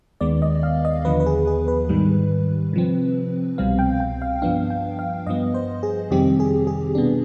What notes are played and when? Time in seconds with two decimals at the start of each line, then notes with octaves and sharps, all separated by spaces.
0.21 D#2 D#3 G#3 B3 D5
0.42 D#5
0.63 F5
0.85 D#5
1.05 D#2 D3 F3 B3 B4
1.20 B4
1.26 G#4
1.47 G#4
1.68 B4
1.89 G#2 D#3 G3
2.73 C3 F3 C4
3.58 C2 B2 G3 C4 F5
3.79 G5
4.00 G5
4.22 F5
4.42 G2 F3 B3 D4 F5
4.70 G5
4.99 F5
5.27 G2 F3 B3 D#5
5.54 C5
5.83 G#4
6.11 F2 C3 D#3 G3 C4 G4
6.40 G#4
6.67 G#4
6.95 B2 B3 D4